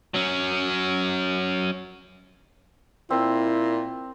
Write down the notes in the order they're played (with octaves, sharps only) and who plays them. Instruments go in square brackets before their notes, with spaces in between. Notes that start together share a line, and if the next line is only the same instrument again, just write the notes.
[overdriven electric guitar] F#3 C#4
[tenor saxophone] A#2 [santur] C4 [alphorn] E4